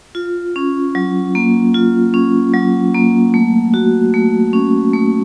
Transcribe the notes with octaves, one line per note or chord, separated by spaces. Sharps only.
F4
C#4
F#3
A#3
F4
C#4
F#3
A#3
A3
F#4
A3
C#4
A3